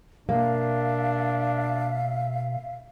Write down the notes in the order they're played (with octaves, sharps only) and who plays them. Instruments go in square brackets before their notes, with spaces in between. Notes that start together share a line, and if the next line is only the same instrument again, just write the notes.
[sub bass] B2 [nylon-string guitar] A#3 [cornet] D4 [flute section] E5 F5